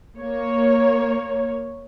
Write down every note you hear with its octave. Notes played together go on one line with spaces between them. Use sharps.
A#3 C#5